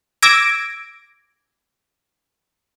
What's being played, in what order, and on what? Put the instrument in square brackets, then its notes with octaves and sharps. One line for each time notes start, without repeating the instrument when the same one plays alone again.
[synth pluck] D6 E6 G#6 A#6 D7